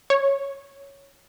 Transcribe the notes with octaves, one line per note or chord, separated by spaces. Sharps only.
C#5